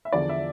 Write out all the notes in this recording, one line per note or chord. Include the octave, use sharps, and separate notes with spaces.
E5
E2 D3 F3 D5
E5